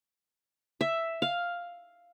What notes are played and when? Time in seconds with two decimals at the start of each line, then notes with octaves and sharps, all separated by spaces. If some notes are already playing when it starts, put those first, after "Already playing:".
0.81 E5
1.22 F5